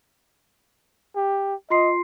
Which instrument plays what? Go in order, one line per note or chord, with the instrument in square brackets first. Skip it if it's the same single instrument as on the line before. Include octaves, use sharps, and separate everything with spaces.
[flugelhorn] G4
[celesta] F4 C6 C7 [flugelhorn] D#5